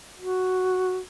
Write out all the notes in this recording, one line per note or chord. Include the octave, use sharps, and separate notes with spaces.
F#4